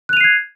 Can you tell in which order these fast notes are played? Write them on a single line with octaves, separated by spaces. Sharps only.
F#6 F7 D#7 C7 G#6